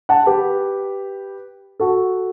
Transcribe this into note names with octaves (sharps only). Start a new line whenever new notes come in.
F#5 A5
G4 B4
F#4 A4